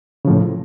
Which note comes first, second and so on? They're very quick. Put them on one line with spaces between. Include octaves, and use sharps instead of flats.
C#3 F3 A2